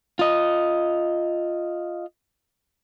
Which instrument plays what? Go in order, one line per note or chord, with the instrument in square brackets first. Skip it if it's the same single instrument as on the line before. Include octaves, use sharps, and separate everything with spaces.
[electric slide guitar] F4 D#5